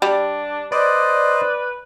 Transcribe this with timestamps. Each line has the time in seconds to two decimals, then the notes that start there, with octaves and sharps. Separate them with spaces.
0.02 G3 D4
0.72 B4 C5 D5 D#5